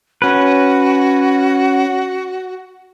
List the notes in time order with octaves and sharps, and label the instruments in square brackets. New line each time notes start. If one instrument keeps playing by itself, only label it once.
[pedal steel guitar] C#4 B4 [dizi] F#4